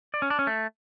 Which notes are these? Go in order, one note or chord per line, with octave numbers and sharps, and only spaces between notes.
D5
C#4
D4
C#4
A3